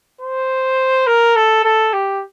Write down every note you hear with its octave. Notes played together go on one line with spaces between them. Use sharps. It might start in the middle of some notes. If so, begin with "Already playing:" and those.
C5
A#4
A4
A4
G4